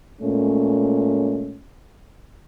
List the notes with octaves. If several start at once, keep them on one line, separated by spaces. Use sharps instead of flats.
A#2 G#3 A3 C#4